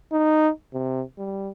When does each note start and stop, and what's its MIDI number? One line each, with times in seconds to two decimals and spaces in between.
0.12 0.50 63
0.73 1.03 48
1.18 1.50 55